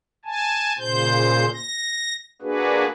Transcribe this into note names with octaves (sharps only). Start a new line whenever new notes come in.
G#5 A5
A#2 C#3 C5 G6
A#6
A#3 D4 F#4 G#4 B4